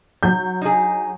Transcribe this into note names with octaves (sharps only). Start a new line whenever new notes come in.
F#3 G6
D#4 G#4